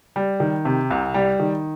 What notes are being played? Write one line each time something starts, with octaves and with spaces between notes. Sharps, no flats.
G3
D#3
C3
C2
G3
D#3